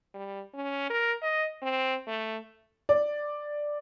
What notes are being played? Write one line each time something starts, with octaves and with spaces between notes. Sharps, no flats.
G3
C#4
A#4
D#5
C4
A3
D5